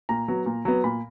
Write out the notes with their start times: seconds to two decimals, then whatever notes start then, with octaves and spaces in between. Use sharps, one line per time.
0.09 A#2 A#5
0.28 F#3 B3
0.46 A#2
0.65 F#3 B3
0.84 A#2 B5